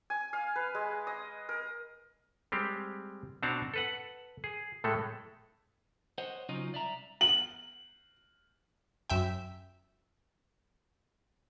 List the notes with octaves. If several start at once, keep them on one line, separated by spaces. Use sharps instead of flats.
G#5
F5
B4
G#3
D#5
A#4
G3 G#3 C4 G4
B2 C4 D4 F#4 A5 A#5
A4 B4 F#5
G#4
A2 G#3 A3 A4
C5 C#5 D#5 F#5
C#3 F#3 C#4 D#4 F4 D#5
C2 D5 E5 A#5
F#7
F#2 E5 G5